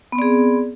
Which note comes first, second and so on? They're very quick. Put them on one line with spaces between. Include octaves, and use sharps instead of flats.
B3 C4 D5 G#4